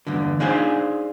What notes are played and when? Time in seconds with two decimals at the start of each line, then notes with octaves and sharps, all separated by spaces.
0.07 E2 G2 D3
0.40 D4 D#4 F4 G#4 C5 G#5